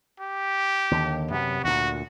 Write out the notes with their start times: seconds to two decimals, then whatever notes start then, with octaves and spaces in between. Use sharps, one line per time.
0.20 G4
0.91 D#2 D3
1.31 F#2 C3 B3
1.64 D2 A#2 F#4